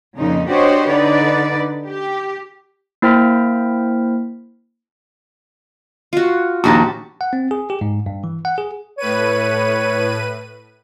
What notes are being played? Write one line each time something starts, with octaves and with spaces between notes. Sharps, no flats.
F2 A#2 C#3 D#4
D4 F#4 G4 C5 C#5 D#5
D3 D#4 B4 D5
G4
A#3 E4 C5 G5 F6 B6
F4 F#4
A#1 D#2 F#4 G4 A5 A#5
F#5
C4
G#4
G4
G#2
G2
E3
F#5
G#4
A2 B4 C#5 D#7